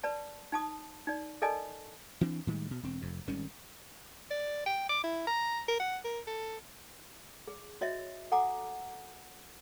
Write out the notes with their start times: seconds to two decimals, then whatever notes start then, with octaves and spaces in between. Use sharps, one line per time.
0.03 B4 D5 A5
0.52 D#4 A5 D#6
1.07 D#4 D5
1.42 A4 A#4 D5 D#5 G#5 A5
2.21 E3 C4 D4
2.47 A2 D#3 G3 G#3
2.71 B2
2.83 E1 C4
3.02 F1 F2
3.27 G#1 D#3 G3 C#4
4.31 D5
4.66 G5
4.89 D6
5.04 E4
5.27 A#5
5.68 A#4
5.80 F#5
6.05 A#4
6.27 A4
7.48 G#4
7.81 F#4 C#5 D#5 E5
8.32 A4 F#5 G#5 A#5 D6